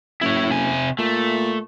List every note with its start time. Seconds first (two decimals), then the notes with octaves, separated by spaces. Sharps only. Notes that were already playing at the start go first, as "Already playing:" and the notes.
0.21 F#1 E4 C#5
0.50 C3 G#5
0.98 A#2 A3